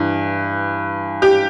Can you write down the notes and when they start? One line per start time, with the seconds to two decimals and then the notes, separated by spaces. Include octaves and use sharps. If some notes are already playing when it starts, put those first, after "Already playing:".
Already playing: G2 E3
1.22 G4